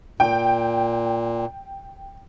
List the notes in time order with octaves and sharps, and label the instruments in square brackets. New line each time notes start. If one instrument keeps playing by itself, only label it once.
[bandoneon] A#2 [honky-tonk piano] G5